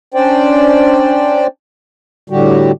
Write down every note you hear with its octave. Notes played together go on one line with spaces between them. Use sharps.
C#4 D4 C5 D5 G5
A2 D3 G3 F#4 G4